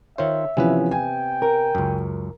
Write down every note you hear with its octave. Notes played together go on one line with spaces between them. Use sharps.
D#3 F4 C5 C#5 E5
C3 E3 F3 B3 C#4 B4
G5 G#5
A#4
C#2 F#2